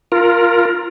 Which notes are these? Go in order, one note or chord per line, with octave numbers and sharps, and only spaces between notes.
F4 A#4